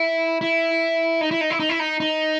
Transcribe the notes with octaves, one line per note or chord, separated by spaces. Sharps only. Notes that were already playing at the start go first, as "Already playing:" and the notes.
Already playing: E4
E4
D#4
E4
D#4
E4
D#4
E4
D#4
D#4